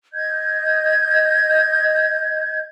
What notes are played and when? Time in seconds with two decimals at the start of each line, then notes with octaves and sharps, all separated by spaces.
0.13 D#5 G6 G#6